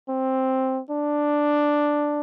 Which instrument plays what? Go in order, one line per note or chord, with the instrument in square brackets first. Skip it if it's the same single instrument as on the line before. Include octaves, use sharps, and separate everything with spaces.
[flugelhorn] C4
D4